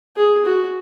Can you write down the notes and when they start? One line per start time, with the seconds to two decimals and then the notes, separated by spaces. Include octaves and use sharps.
0.16 G#4
0.45 F#4